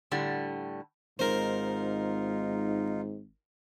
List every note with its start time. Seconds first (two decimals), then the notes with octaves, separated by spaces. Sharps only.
0.11 A2 D3 G3
1.19 G#1 G#2 D#4 F4 A#4 C5